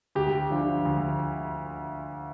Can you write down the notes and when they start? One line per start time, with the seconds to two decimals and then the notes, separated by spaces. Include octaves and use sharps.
0.15 D2 G4
0.50 D3 F3
0.85 D2